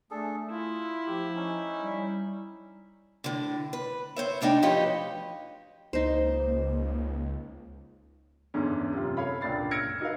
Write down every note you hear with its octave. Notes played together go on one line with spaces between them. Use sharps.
A3 D4 G#4 A4
E4 F4
F3 G4
C#4 D#4
G3
A2 D3
B4
C5 C#5 E5
D2 A3 D4 D#4 G5
F3 G4 B4 C#5 D#5
C#2 A#3 D#4 C5
E2 G#2 D3 C#4
F#2 C3 F4
A4 C#5 F5 B5
C#2 A#2 D4 A6 C7
E6 F6 G#6 A#6 C#7 D7
D#4 F#4 A#4 B4 F5